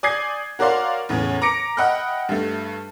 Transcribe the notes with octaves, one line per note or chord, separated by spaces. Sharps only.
D5 G#5 D#6 G6 G#6 C7
F#4 A#4 C#5 D5 F5 C6
E2 A2 C#3
A#5 D6 A#6 C#7 D7
D#5 E5 F#5 G5 B5 F6
G2 A3